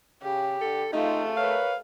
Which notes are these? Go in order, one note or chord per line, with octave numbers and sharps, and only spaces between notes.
C#3 G4
D3 A4
F2 C#3 A3 D#4 F4
A#4 B4 C#5 F5